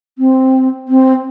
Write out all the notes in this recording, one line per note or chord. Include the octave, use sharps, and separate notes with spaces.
C4
C4